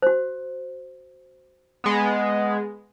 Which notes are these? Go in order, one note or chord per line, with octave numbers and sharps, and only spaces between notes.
F#4 C5
G#3 B3